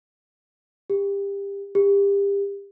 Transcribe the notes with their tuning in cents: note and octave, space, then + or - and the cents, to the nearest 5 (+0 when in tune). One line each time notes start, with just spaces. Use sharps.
G4 +25
G4 +30